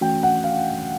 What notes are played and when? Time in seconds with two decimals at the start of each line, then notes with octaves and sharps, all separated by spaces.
0.01 E3 A3 C#4 F#4 G5
0.23 F#5
0.44 F5